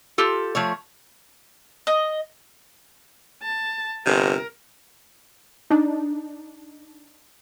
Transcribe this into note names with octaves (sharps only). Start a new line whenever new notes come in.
F4 G4 A4
F3 A3 C#5
D#5
A5
G1 C3 A#4
D4 D#4